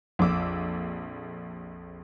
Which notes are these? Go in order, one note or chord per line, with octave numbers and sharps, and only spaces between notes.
A#1 F2 D6 E6